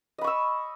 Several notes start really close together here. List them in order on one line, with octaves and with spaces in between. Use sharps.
D#5 B5 C#6 E6